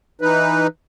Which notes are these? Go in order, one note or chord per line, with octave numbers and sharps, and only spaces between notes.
E3 D#4 B4